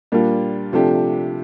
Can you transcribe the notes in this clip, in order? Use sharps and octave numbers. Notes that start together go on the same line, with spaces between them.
A#2 G3 A#3 D4 F4
C3 F3 A3 D4 G4